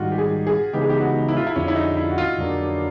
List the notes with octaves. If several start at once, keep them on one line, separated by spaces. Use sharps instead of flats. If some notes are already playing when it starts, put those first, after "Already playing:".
Already playing: G#2 D#3 G3 F4 F#4
G4
G#4
G#4
C#3 E3 G#3 B3 D#4 G4
G#4
G4
F#4
E4
F4
E4
F2 D3 F3 C#4
E4
D#4
E4
F#4
F4
F2 D3 F#3 A#3 D4